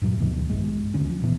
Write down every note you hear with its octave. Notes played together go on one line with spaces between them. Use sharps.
G2 A#2 F#3
D2 B2 D#3 F3
A#1 G2 G#3
D2 D3 C#4
F3
D1 A#2 E3 B3